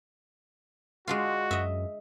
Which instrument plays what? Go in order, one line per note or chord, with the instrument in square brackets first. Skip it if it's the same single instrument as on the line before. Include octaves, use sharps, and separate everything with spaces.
[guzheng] G#3 D4 F4 [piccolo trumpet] F#4
[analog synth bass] F#2 [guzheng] D#5 E5